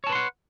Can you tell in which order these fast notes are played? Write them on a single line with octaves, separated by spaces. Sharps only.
C#5 A5 B4 C6 F#5